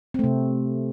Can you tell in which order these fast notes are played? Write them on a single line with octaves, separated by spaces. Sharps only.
C4 A3 C3